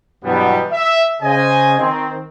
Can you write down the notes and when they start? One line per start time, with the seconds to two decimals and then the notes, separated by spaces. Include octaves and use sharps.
0.24 G2 B2 E3 F#3 G3 B3
0.72 E5
1.22 C#3 C5 D#5 G#5
1.79 D#3 C4